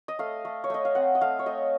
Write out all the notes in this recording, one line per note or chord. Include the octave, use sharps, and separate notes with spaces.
D#5
A3 F5
A3
C#5
A3 D#5
F5
C4 F#5
D#5
A3 F5
C#5
A3 D#5